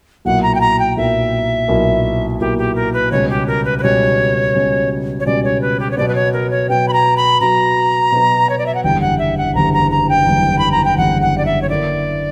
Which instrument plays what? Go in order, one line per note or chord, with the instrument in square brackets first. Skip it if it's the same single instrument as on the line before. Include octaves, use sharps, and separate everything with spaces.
[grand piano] B1 A#2 F#3 A#3 E4 [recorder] F#5
[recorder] A#5
G5
A#5
G5
[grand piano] B1 A#2 F#3 A#3 E4 [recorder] E5
[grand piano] B1 A#2 F#3 A#3 E4
[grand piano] B1 A#2 F#3 A#3 E4 [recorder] G4
[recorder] G4
A#4
B4
[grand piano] C#2 B2 G3 C#4 [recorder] C#5
[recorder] G4
A#4
B4
B4
[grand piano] C#2 B2 G3 C#4 [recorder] C#5
[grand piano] C#2 B2 G3 C#4
[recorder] C#5
[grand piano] C#2 B2 G3 C#4 [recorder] D5
[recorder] C#5
B4
G4
C#5
[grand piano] B2 F#3 B3 [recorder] D5
[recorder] B4
C#5
A#4
C#5
[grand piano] B2 F#3 B3 [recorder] G5
[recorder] B5
A#5
B5
[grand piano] B2 F#3 B3 [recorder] A#5
[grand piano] B2 F#3 B3
[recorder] C#5
D5
E5
F#5
[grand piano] F#1 E2 D3 G3 [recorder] G5
[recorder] F#5
E5
F#5
[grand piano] F#1 E2 D3 G3 [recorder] A#5
[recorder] A#5
A#5
G5
[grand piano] F#1 E2 D3 G3
[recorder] B5
A#5
G5
[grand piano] F#1 E2 D3 G3 [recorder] F#5
[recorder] F#5
D5
E5
C#5
[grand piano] D3 A#3 E4 [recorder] D5